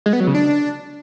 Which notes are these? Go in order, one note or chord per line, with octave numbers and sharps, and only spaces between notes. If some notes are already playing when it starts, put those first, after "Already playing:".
G#3
B3
F#3
C#3
D4